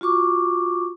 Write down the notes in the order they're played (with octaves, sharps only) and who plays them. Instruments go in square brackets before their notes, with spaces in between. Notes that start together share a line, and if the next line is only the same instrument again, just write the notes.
[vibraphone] F4 F#4 C#6 D6